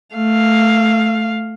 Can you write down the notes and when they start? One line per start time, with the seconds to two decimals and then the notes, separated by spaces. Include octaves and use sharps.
0.14 A3 F5